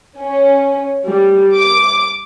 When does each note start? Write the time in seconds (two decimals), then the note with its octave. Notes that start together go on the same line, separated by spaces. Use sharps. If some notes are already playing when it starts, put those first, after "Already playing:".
0.20 C#4
1.07 G3
1.55 D6